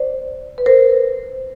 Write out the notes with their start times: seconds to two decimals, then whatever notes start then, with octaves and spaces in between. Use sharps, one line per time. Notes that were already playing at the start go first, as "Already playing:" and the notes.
Already playing: C5 D5
0.58 B4
0.66 A#4 C5